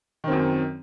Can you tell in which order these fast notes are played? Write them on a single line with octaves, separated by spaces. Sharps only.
D#3 C4 F#2